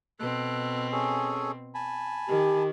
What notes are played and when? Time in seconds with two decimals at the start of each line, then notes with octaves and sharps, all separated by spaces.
0.20 B2 C4 A4 F#6
0.92 C#4 G#4 A4
1.75 G#5 A5 B5
2.29 D#3 G4